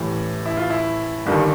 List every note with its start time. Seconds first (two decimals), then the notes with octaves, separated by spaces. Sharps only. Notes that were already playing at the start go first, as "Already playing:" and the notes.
Already playing: A1 A2 E3 G3
0.46 E4
0.57 F4
0.70 E4
1.26 G1 G2 D#3 G3